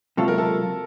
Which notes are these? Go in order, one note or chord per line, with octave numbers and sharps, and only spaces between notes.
C#2 C3 F#3 A#3 F4 A4
A#4
A4